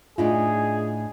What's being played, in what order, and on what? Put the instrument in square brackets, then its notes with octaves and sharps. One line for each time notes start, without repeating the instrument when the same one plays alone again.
[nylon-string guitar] A2 D4 D#4 [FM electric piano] F4 [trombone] G#4